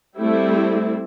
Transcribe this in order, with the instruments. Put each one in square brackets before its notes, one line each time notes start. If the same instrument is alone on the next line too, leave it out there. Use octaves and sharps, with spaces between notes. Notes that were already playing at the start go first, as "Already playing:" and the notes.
[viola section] G3 A3 C4 E4